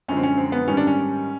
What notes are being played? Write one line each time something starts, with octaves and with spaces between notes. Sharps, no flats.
F#2 D3 F3 G#3 C#4
C4
C#4
C4
B3
G#2 D#3 G3 C#4
D4
C#4